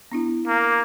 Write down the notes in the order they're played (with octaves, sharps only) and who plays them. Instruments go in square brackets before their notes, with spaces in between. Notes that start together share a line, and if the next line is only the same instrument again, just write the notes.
[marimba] B3 D4 E4
[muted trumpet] A#3